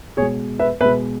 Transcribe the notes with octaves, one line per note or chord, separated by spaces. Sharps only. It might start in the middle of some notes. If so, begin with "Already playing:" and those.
B2 G#3 G#4 C#5
B4 E5
B2 G#3 B4 E5